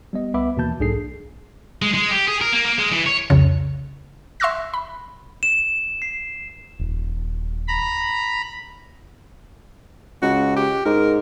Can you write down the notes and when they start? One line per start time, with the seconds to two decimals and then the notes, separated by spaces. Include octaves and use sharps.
0.13 G3 B3 D#5
0.34 C2 B3 B4 E5 B5 D6
0.57 D#2 B2 E3 A#3 A5 G6
0.80 B1 G#2 D4 G#4 A4 C7
1.82 G#3
1.94 G#3
2.11 G4
2.28 G#4
2.41 A#4
2.53 A#3
2.65 A#3
2.79 G#3
2.92 E3
3.07 C#5
3.30 C2 F2 C#3
4.40 E5 C6 C#6 E6 F#6 A#6
4.73 B5
5.43 E7
6.02 C7
6.79 D#1
7.68 A#5 B5
10.22 C#2 F#4
10.56 G4
10.85 G#2 A#4